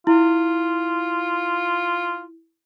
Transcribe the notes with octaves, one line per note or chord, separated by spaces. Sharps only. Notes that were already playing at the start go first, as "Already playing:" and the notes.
E4 F4